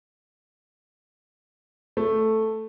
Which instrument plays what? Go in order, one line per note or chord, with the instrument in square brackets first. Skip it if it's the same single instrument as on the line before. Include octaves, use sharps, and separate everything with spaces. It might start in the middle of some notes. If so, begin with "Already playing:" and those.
[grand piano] A3